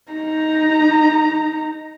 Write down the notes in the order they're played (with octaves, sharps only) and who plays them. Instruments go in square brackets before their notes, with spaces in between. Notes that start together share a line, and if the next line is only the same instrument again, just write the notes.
[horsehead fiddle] D#4 A#5